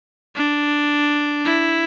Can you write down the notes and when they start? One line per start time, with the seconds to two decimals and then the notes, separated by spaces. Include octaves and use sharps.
0.36 D4
1.45 E4